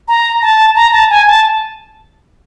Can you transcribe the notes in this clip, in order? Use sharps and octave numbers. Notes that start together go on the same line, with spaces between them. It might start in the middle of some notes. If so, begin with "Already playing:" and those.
A#5
A5
A#5
A5
G#5
A5